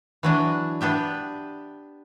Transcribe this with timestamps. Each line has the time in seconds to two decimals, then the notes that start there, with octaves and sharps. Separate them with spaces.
0.23 E3 F#3 D4
0.81 B3 D4 G4 E5